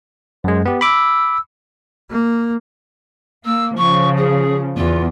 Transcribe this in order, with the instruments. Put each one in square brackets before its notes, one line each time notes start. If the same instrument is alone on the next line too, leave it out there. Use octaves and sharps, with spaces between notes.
[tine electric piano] F#2 G#3 [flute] C5
[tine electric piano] B3 G4 [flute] D5
[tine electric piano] B5 D6 [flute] E6
[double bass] A#3
[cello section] A#3 [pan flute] E6
[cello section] C#3 F3 [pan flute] C#6
[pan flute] G#4
[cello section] E2 [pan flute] F4